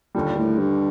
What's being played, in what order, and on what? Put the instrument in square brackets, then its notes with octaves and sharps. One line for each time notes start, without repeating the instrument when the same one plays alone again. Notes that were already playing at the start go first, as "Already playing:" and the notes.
[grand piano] D#2 D3 G3 [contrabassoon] A#2
[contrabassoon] A2
G2